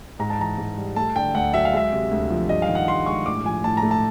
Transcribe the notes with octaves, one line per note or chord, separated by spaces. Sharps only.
G#2 A#5
A5
E3 A#5
G#2
G3
A3 A5
D3 G5
D2 F#5
F#3 E5
F5
G#3 E5
C3
D2
F3
G2 D#5
F5
D#3
F#5
G2 C6
G#3 C#6
A2 D6
F3 G#5
A2 A5
A#5
A3
A5